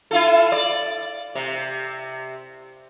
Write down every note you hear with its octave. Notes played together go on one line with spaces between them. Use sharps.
E4 F4 A4
D5
C3